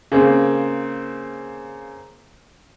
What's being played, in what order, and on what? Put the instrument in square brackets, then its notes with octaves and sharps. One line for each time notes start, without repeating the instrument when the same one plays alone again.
[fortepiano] C#3 A#3 C4